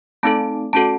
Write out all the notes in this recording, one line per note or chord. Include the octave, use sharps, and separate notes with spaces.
A3 C4 D#4 A4 A5
A3 C#4 F#4 A4 A5